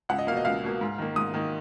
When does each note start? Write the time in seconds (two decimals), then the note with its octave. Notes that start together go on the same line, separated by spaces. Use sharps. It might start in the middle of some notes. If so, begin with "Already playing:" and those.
0.09 C#2 F#5
0.18 D#5
0.27 A#3 F5
0.32 B2
0.37 D#5
0.45 C#2 F5
0.64 B2 A#3
0.81 G#2
0.98 D#3 A#3
1.16 G#2 D#6
1.34 D#3 A#3